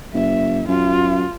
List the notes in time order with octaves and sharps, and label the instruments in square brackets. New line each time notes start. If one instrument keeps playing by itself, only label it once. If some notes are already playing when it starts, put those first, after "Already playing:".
[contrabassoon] F#1 [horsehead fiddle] E5
[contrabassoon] F#2 [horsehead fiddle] F4